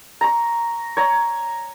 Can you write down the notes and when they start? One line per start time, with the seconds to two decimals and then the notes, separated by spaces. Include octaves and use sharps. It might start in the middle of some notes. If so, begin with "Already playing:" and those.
0.21 A#5 C#6
0.97 C#5 A#5